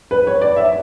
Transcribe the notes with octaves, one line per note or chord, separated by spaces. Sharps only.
B4
C#5
D5
E5